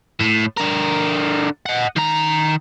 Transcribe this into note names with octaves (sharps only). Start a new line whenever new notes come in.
A2
D3 A#4
D#5 F#5
D#3 A#5